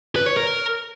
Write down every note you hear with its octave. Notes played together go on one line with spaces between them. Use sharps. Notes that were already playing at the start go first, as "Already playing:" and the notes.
B4
C#5
A#4